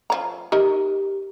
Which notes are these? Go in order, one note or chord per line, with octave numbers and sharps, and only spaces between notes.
F3 C#5 A#5
D#4 G4 A#4 D#5